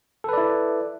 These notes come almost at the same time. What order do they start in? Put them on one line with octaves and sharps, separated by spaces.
A4 B4 D5 E4